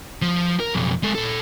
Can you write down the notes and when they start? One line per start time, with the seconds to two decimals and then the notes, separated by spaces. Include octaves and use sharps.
0.22 F3
0.60 A#4
0.74 B1 F2
1.03 G#3 A4
1.15 A#2 A4